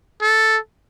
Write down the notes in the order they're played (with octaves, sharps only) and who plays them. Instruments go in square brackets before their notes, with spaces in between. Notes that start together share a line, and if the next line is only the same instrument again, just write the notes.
[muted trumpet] A4